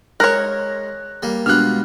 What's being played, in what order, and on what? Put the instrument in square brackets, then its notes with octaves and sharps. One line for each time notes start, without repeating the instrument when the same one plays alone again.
[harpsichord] G#3 [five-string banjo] A#4 C#5 [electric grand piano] F#6 A#6
[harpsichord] G3 A#3
[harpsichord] B2 G3 F4 [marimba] G#3 D4 [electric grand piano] F6 F#6